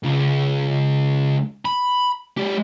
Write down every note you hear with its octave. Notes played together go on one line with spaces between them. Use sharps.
C#2
B5
G#3 G4